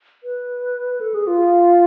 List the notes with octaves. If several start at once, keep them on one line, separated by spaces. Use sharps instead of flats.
B4
A4
G#4
F4